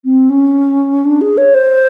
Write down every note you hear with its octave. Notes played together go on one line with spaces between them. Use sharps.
C4
C#4
D4
G#4
C#5
C5